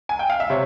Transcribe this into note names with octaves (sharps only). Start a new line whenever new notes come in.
G#5
G5
F5
E5
C3 C#5